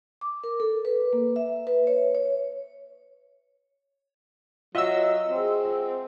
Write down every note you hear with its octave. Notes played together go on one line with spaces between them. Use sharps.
D6
A#4
A4
B4
A#3
E5
B4
C#5
C#5
F#3 F4 D#5 E5 F#5 E6
G#3 C4